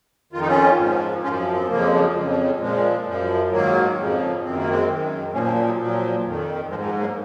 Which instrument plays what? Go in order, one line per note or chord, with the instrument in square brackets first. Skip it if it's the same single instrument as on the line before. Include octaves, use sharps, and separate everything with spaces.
[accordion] F2 D#3 F4
D#4
C#4 F4
G#2 F3
F#2 F3 C#4 F4
C4
F2 C#3 F3 A#3
G#3
F#3 A#3
F2 C#3 F3 G#3
F3
F#3
A#2 F3 G#3
F#2 F3
G#2 D#3 F#3 A#3
F2 C#3 F3
F#2 D#3 C4
A#3
G#3 C4
F#2 D#3
A#2 F3 A#3 C#4
F#3 A#3
F#3
F#3
A#2 F3 F#3
F2 D#3
F3 G#3
G#2
F3 G#3
F#3 A#3